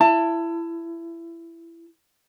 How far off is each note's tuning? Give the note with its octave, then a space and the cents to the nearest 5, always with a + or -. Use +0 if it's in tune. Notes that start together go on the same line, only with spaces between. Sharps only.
E4 +20 A5 +25